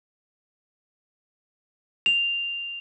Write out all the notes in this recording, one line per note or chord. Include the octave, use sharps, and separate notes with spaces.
F7